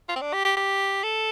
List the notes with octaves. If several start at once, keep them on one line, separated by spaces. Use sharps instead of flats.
F4
C4
D4
G4
G4
G4
A4